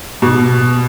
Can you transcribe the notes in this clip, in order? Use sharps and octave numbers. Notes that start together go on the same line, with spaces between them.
B2